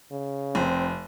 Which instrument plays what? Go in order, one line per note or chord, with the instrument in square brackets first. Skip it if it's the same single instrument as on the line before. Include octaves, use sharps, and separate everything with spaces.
[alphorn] C#3
[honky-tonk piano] F1 [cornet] C4